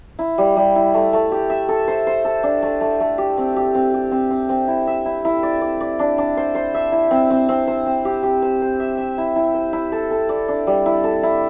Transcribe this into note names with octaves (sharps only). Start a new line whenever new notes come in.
E4
G3
G3
E4
A3
A3
G4
E5
A4
C5
C5
A4
D4
A3
A3
A3
G4
C4
G4
C4
G4
C4
C4
C4
E4
E5
E4
E4
D5
D5
D5
D4
D4
C5
C5
E5
E4
C4
C4
C4
C5
C4
G4
G4
C5
C5
E5
E5
E4
E4
C5
E4
A4
A4
D5
D4
G3
E4
A4
E4